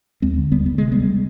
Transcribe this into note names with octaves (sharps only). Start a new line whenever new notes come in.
D#2 G#3 C4
D3
D#2 G3 B3
D3 B3
C3 G#3
D2 G3 B3